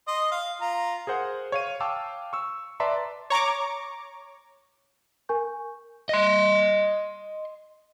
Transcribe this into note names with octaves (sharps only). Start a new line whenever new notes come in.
D#5 C6
F5
F4 A#5
G#4 A#4 C5 F#5
C#5 F5 D#7
F5 G5 A5 D6 E6
C#6 E6
B4 D5 E5 A5 A#5 C6
C#5 A#5 C#6 D6
A#4 G#5 C#6 G6
D#5 C6